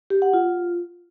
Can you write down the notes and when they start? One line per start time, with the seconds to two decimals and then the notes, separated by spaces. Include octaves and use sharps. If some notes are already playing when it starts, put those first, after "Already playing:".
0.10 G4
0.22 F#5
0.34 F4